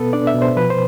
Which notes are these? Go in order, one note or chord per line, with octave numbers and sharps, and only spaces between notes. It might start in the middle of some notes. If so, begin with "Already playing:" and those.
Already playing: B2 B3 A4 B4
D4 D5
E5
B2
C5
F3 B4
C5